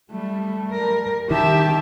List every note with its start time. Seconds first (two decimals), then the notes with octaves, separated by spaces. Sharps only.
0.12 G3 A3
0.71 G3 A#4
1.31 D#3 G4 E5 A5